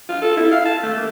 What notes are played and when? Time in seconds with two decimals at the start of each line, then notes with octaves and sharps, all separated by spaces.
0.09 F4
0.22 A4
0.37 E4
0.51 F5
0.65 A5
0.82 A3
0.97 A#3